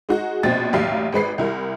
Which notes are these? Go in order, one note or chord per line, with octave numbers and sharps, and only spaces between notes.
G#3 D#4 F#4
A#1 B2 C4 A6
A1 D#2 F#3 G3 E5 F5
G#1 G#3 B4 C7
C2 E4 A#4